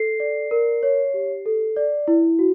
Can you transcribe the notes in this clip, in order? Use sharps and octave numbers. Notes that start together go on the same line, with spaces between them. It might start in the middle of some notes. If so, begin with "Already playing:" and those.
Already playing: A4 C7
D5
A#4
C#5
G4
A4
D5
E4
F#4